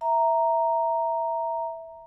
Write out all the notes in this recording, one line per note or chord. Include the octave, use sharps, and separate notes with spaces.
E5 A#5